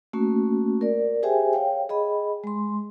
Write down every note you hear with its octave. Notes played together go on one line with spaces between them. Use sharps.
A3 A#3 C#4 F#4
A#4 D5
G4 G#4 C5 E5 G5 G#5
C#5 F5 G5
G#4 D#5 B5
G#3 C6